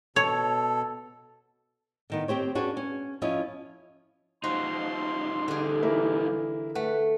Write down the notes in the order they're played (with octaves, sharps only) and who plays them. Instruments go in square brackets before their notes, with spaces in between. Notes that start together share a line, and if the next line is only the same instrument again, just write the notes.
[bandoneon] B2 A4 [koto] C#5
[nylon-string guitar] D3 D#3 B3
C4 G4 C5 C#5
C#4 D4 F#4 G#4 B4
C#4
F3 C#4 E4 F4 D#5
[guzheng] F3 F#4 [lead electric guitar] G3 D#4 [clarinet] C6
[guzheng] D3 G#4 [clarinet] G4
[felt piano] E3 A#3 E4
[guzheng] A3 [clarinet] B4 [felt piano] F#5